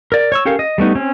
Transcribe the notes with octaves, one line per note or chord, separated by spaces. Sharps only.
A#4 D5
C#5 C#6 E6
C#4 G4 A4 A#4 F5
D#5
G3 A3 B3 D#4
C4 C#4